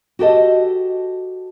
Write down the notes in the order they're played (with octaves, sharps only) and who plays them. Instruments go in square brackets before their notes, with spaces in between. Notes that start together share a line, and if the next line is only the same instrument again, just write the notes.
[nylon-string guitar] F#4 G4 A4 D#5